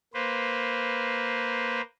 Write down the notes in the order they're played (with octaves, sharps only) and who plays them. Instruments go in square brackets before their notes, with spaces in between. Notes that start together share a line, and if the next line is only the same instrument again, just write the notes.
[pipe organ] A#3 B4 C5